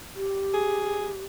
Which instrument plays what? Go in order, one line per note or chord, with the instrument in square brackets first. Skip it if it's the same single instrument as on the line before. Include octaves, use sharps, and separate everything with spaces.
[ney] G4
[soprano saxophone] G#4